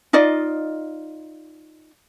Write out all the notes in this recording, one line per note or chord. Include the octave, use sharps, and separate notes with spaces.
D#4 F4 D5 D#5